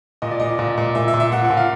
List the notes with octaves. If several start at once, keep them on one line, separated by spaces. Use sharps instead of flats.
A#2 D#5
D5
A#2 D#5
A#2
A#2
A#2 E5
E5
A#2
E5
A#2 F#5
F#5
A#2
F5